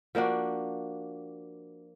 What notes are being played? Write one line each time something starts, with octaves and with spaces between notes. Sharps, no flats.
F3 A#3 D4 F#4